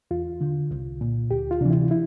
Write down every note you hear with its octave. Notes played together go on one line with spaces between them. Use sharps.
E2 F4
D3
C2
A#2
D2 G4
F4
C3 E3 D4
E4
E4